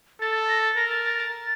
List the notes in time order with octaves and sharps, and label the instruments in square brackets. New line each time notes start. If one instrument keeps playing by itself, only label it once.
[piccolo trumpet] A4 [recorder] A6
[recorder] A6
A#6
A6
[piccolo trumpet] A#4 [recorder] A#6
[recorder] A6
A6
A6